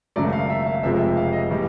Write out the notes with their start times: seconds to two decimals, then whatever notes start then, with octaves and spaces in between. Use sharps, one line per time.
0.16 G#1 F#2 C#3 F#3 A3 D5
0.33 F5
0.50 E5
0.66 F5
0.83 F1 F2 C3 F3 G#3 E5
0.99 E5
1.17 F5
1.33 D#5
1.50 A2 E3 G3